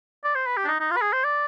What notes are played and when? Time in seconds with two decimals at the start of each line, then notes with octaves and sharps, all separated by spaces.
0.24 D5
0.35 C5
0.46 B4
0.57 G4
0.65 D4
0.68 D#4
0.80 D#4
0.91 F4
0.96 B4
1.01 G#4
1.13 C5
1.24 D5